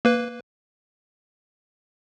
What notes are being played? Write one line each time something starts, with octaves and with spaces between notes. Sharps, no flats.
A#3 B4